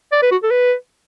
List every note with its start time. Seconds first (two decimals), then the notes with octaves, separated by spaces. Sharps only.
0.12 D5
0.22 B4
0.31 F#4
0.43 A4
0.51 B4